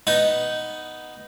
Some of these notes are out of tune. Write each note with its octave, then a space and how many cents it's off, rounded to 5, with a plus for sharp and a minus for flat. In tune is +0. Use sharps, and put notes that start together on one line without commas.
B3 +0 D#4 +0